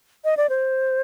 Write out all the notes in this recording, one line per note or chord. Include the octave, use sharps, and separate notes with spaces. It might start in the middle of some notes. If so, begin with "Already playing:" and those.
D#5
D5
C5